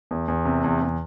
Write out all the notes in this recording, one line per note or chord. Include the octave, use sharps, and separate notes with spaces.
E2
E2
C3
E2
E2